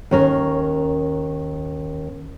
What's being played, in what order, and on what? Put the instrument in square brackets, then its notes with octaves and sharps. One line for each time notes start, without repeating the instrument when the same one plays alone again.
[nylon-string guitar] D#2 C#4 A#4